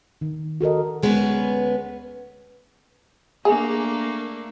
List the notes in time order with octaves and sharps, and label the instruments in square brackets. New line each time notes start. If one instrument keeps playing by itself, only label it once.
[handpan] D#3
F#4 A4 A#4 D#5
[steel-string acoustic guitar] D2 G#3 B3 C#4 B4
[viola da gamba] A3 A#3 D4 [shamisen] G#4